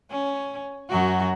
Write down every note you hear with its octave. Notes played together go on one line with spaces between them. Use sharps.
C#4
F#2 F#3 F#4